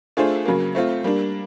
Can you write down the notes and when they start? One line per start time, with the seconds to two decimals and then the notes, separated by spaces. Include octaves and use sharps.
0.17 A3 D4 F4 G#4 C5
0.45 C#3 F#3 A#3
0.75 A3 C4 F4
1.04 G3 A#3 D4